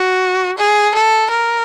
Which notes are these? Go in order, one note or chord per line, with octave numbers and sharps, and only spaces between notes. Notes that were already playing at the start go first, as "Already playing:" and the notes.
Already playing: F#4
G#4
A4
A#4